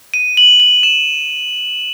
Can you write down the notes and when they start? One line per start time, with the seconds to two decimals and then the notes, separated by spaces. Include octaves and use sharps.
0.14 D#7
0.37 F#7
0.60 F#7
0.83 E7